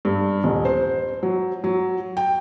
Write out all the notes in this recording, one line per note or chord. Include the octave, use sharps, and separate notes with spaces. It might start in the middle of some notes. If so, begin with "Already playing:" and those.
G2
D#1
C5
F#3
F#3
G5